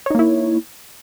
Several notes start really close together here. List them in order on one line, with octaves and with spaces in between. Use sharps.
C#5 D#4 A#3 E4